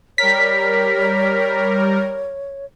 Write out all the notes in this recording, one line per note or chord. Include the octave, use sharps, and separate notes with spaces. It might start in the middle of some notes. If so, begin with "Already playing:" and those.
G3 A#4 C#5 B6